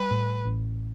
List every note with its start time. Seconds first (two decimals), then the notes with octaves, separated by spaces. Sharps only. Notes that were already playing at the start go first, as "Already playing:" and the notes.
Already playing: G3 B4
0.11 A2
0.45 A1